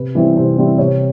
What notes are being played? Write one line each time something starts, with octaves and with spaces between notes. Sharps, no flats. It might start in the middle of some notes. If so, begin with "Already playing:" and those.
Already playing: C3 B4
E3 G3 C4 E4
C3 C5
E3 G3 C4 E4
C3 C#5